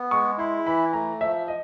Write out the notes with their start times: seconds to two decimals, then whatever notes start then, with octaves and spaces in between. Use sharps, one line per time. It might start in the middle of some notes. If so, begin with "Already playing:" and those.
Already playing: B3
0.11 G#3 C#6
0.39 E4 C6
0.66 E3 B5
0.93 A3 A#5
1.21 F3 E5
1.48 D#5